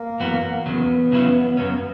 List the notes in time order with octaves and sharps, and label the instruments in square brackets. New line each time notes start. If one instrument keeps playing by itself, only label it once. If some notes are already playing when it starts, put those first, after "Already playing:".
Already playing: [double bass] A#3
[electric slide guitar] F#2 E3 B3 F#4
[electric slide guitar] E2 C#3 F#3 [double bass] B3
[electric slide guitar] E2 C#3 F#3 C#4 E4
F#2 C#3 F#3 C#4